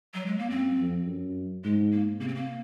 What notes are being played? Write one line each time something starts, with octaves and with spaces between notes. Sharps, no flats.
F#3
G#3
A#3
F#2 C4
F2
F#2
G#2 G#3
A#3
C3 A#3
C4
A#3